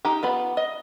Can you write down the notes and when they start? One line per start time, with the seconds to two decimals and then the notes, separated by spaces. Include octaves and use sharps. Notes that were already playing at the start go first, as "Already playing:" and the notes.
0.05 D#4 G4
0.23 B3 F4 B5
0.57 D#5